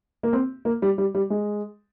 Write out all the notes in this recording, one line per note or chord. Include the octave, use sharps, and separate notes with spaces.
A#3
C4
A#3
G3
G3
G3
G#3